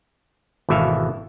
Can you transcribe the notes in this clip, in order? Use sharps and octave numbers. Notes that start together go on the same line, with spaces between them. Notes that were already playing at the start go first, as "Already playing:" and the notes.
G#1 B2 E3 A4 E5 F5